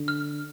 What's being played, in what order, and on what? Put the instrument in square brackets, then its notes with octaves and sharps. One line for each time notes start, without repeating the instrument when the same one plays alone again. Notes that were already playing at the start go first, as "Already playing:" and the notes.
Already playing: [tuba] D3
[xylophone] F6